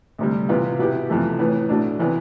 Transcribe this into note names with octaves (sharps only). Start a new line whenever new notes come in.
D2 C3 G3
C3 E3 B3 F4
B2 B3 E4 G4
F2 C3 E3 A3
A2 E3 B3
B2 A3 D4
C3 E3 B3